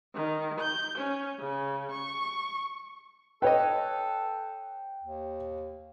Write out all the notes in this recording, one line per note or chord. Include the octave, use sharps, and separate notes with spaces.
D#3
G6
C#4
C#3
C#6
A4 B4 C#5 D#5 G5
D#2